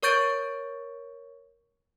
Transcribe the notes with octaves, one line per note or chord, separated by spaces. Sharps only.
A#4 C#5 C#6 G6 A6 D7